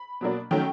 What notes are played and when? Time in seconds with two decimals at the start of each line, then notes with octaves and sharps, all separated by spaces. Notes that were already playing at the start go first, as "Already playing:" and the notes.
Already playing: B5
0.21 B2 F#3 A#3 D4
0.51 D#3 F#3 A3 C#4 G5